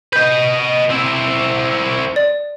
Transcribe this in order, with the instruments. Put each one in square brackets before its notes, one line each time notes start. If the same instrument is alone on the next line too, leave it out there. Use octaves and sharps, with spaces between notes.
[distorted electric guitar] B4 D#5 [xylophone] G6
[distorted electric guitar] C4 E4
[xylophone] D5